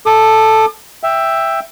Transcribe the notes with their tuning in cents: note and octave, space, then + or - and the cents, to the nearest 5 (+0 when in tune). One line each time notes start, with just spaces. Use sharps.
A4 +0 D6 +45
E5 +5 G5 +5